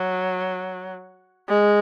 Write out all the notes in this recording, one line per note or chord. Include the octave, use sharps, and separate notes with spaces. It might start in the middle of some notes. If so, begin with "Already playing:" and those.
Already playing: F#3
G#3